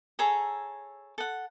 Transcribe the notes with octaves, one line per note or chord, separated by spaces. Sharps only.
G#4 A4 C#5 A#5
A4 F#5